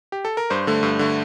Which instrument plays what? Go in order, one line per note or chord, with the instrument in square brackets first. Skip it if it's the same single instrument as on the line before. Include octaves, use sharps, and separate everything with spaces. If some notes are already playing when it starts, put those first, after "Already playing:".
[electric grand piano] G4
A4
A#4
G2 C5
D3 A3
G2
D3 A3